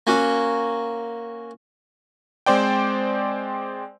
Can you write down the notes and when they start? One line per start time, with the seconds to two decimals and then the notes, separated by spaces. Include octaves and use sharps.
0.07 A#3 C#4 F#4
2.46 G#3 C4 C5 D5 G5